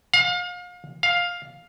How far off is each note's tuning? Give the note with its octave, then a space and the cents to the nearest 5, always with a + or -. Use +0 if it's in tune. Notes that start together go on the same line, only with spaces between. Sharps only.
F5 +35
F5 +10